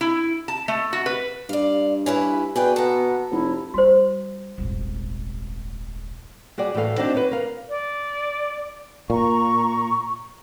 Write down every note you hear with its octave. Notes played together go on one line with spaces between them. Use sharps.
E4
A5
A3
F#4
B4
G2 D5 F5
C#4 E4 B4
B2 G#4 B4 D5 G5
B3 A4 A#5
F1 E4
G3 F#4 C5
D#1 G#1
G3 F#4 G#4 D5
A2 E3 F#4 A4 F5
C4 D4 D#4 F#4 C5
B4 C#5
A#4 F5
D5
A#2 A#5 C#6